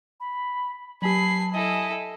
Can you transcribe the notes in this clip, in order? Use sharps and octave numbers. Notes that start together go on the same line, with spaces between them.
B5
F#3 G4 G#5 A5 B5 C7
E4 A4 D#5 G#5